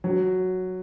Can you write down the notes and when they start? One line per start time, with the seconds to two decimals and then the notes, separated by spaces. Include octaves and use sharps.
0.04 F#3